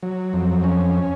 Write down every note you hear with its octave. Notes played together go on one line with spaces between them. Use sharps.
F#3
F2
C#4